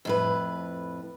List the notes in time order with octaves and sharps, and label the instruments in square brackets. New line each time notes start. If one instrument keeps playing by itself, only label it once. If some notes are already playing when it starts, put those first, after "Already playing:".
[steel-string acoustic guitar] F2 A2 B4